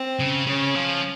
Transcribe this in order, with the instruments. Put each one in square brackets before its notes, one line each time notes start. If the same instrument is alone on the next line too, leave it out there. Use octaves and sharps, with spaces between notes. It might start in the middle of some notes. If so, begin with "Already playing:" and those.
Already playing: [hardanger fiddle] C4
[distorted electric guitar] C#3
[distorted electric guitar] C#3 [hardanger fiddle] C#4
[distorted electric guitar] F3